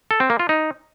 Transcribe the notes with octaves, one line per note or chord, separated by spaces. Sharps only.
A4
C4
A#3
F4
D#4